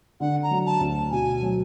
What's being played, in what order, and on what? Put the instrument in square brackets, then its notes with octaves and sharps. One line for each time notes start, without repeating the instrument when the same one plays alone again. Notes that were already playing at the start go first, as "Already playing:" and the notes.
[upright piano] D3 [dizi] F#5
[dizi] A#5
[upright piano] F#3
[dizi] A5
[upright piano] D2
[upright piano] B2 [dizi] G#5
[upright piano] F#3